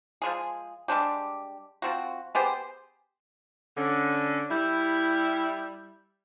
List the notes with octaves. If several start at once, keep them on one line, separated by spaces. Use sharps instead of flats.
F3 G#3 G#4
G3 G#3 D4 G4
F3 C4 F#4
B3 G4 G#4 C5
D3 C#4
G3 E4